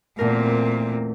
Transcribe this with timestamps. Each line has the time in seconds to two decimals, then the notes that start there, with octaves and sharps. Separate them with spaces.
0.19 E2 A#2 A3 C4 A#4